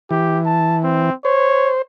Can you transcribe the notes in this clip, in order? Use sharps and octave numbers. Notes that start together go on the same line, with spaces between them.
E3 G4
A5
C4
C5 C#5